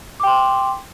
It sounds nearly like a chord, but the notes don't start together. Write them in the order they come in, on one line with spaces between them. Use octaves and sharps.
D6 G5 C6